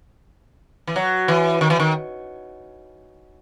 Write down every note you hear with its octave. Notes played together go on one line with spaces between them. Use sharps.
E3
F#3
E3
D#3
E3
D#3